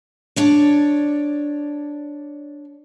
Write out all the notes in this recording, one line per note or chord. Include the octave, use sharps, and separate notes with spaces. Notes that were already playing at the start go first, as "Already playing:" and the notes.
D4 C#5 D5